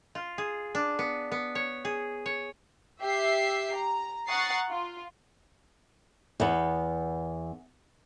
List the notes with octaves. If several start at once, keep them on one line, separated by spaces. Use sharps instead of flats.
F4
G#4
D4
B3
B3
C#5
G#4
C#5
G4 E5 C7
A#5
F#5 A#5 C#6 D#6 A6 C7
F4
E2 B3